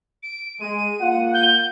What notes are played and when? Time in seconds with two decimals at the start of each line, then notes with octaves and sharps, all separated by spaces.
0.23 D7
0.61 G#3 D#7
1.01 A#3 F4 F#5
1.34 G6